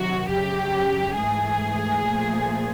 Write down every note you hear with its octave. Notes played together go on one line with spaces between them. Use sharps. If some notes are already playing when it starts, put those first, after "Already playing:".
Already playing: C3 D#3 F#3 F#4
F#2 C#3 F#3 G4
G#2 E3 A3 G#4
A#2 F3 A3